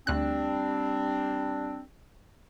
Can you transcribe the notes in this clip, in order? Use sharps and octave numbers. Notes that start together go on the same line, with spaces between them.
D2 G3 C4 D4 F#6